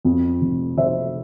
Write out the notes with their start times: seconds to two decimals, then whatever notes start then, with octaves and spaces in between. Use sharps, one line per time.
0.05 F2
0.41 F1
0.77 F1 C5 E5